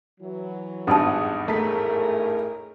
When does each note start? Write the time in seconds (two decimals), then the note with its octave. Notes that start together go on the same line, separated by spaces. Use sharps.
0.20 E3 F#3
0.87 G#1 E2 G2 D4 F#5 A5 D#6
1.48 A2 A3 G#4 A#4 A#5 B6